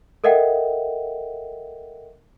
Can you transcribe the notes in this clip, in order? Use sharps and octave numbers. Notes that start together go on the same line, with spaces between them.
A4 A#4 D#5 E5 F#5 G5